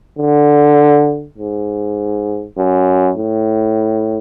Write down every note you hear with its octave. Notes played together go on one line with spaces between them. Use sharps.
D3
G#2
F#2
A2